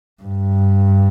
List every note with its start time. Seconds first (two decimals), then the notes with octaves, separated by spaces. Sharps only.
0.23 G2